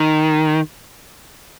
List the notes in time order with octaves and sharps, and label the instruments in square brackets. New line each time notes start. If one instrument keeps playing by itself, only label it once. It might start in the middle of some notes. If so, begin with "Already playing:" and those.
Already playing: [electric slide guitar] D#3